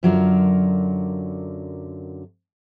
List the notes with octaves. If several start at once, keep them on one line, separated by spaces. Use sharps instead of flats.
F#2 D3 F#3 F4 A#4 D5